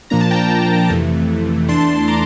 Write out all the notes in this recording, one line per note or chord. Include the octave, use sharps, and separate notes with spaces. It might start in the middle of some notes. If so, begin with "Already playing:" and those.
A#2 F3 A#3 D4 A#5
A5
G5 A#5
F2 C3 E3 A3
E2 E3 A3 D4 A5 C6
A#5 D6